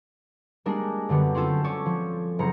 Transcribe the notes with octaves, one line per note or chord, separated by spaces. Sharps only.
G3 G#3 A#3 D4
F#2 D3 G3 B3
C4 C#4 F4 A4
C#4 A4 C#5 D5
F3
F#1 C4 A#5 C#7